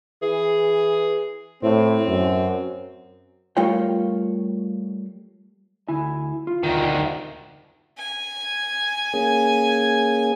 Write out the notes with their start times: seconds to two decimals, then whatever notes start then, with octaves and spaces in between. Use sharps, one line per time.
0.22 E3 G#4
1.63 A2 C4 C5
2.08 F#2
3.57 G3 A3 F4 A#4 C#5 G5
5.88 D2 E4 G#5
6.47 F4
6.64 D2 D#3
7.98 G#5
9.14 A#3 C#4 G#4